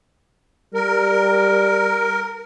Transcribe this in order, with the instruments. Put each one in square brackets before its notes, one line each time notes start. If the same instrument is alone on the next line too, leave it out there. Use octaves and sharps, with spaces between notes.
[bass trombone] G3 [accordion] A#4